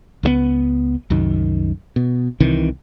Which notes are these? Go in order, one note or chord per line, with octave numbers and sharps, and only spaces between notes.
C#2 F3 B3
C2 F#2 D#3
B2
C2 C3 D#3 E3